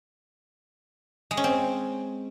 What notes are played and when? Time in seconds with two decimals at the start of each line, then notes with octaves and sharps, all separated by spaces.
1.31 G#3
1.37 C#4
1.44 C4